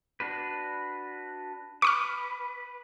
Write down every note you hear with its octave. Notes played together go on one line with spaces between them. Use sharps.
D4 F#4 B4
B4 C#6 D6 F6